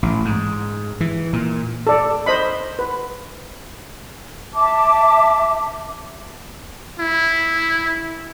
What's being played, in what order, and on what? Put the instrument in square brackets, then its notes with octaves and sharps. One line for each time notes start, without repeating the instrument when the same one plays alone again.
[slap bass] A1
G#2
E3
A#2
[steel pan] A4 D5
C5 D#5 B5
B4
[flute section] E5 A5 D6
[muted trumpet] E4